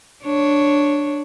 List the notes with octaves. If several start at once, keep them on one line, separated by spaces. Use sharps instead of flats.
D4 C#5